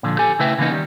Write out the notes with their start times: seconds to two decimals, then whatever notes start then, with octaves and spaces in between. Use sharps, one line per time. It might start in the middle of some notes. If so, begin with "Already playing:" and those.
0.03 A#2 D3 F3
0.19 G4 A4 G#5
0.39 C#3 A3 E4 B4 E5 G5
0.58 C#3 E3 A#3 B3 D#4
0.71 D#3 G3